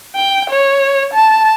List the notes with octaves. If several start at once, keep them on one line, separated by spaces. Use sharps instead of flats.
G5
C#5
A5